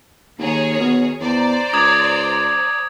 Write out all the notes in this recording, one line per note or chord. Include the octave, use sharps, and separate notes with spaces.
D#2 D#3 G#4 C#5
B2
E2 C5 D5 A#5
C#2 D6 D#6 G#6